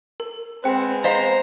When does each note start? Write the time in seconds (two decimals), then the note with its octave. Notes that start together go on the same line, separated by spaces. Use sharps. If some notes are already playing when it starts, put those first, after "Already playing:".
0.20 A#4
0.64 G#3 B3 C4 B4 C5 G5
1.04 C5 D#5 F5 A#5